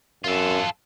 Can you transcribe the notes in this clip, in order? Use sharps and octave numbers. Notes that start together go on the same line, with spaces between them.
F#2 F4 A4